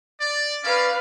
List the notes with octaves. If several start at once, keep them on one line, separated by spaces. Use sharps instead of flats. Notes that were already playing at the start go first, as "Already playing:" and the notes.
D5
C#4 B4 D5 F5